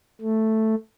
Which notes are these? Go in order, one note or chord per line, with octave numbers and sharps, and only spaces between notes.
A3